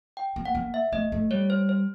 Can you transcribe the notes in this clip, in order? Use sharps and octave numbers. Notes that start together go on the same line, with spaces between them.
G5
A#3
F#5
A#3
E5
A3 D#5
A3
G3 C#5
C5
C5